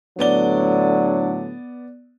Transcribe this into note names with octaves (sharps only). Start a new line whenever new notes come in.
A2 D3 F#3 B3 D4 D5 G7